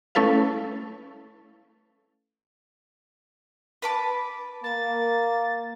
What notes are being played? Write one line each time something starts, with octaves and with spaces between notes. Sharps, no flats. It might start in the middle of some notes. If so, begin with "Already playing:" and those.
A3 C#4 E4 A4 B4 F5
B4 A5 D6
A#3 A6